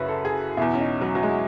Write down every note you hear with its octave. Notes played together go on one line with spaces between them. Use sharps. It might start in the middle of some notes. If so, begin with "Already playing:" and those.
Already playing: F#2 C#3 E4 F#4 B4
A4
G#4
E2 B2 E4
C#4
D#4
F#3
F#3
G#3